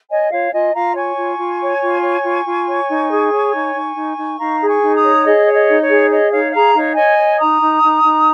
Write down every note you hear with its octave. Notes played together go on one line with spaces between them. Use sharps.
C#5 D#5 G#5
F4 C#5 F5
F4 D#5 G#5
F4 F5 A#5
C#5 G#5 C#6
F4
F4
C#5
F4
C#5
F4
F4
C#5
D#4
G#4
C#5
D#4
D#4
D#4
D#4
D#4 F5 A#5
G#4
G#5 C#6
D#4
A#5 D#6
C#5
G#4 D#5
C#5
D#5
D#4
C#5
G#4
C#5 D#5
D#4 C#5 F5
G#4 F5 A#5
D#4 C#5 F5
C#5 D#5 G#5
C#5
D#4 A#5 D#6
D#4
D#4
D#4